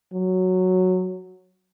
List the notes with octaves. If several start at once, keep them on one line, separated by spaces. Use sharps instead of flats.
F#3